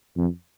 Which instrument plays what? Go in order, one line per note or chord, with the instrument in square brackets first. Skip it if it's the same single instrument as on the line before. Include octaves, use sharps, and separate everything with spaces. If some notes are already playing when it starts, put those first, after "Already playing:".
[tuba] F2